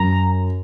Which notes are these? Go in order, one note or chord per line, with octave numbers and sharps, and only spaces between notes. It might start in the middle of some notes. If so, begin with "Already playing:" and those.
Already playing: F#2 A#5